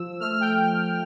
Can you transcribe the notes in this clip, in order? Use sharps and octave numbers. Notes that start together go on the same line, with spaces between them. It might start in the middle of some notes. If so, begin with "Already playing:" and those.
Already playing: F3 E6
A3 F6
G5